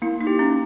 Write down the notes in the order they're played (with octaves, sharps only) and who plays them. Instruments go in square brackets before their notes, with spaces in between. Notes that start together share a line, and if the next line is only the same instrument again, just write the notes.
[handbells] A#3 [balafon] E4
[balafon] D#4
[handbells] G4
[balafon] C#4